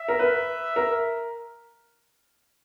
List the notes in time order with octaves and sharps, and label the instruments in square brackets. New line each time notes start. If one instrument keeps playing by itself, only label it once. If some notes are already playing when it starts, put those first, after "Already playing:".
Already playing: [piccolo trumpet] E5
[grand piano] A#4
B4
A#4